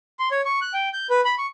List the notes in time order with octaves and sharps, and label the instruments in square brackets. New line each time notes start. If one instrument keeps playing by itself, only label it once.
[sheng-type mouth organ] C6
C#5
C#6
F#6
G5
G6
B4
B5
C#6